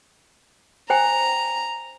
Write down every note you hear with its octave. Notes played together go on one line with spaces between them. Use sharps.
C5 G5 G#5 A#5